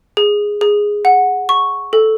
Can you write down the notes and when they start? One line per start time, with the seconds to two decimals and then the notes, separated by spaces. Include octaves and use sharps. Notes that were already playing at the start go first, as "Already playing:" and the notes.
0.17 G#4
0.61 G#4
1.05 F#5
1.49 C#6
1.93 A4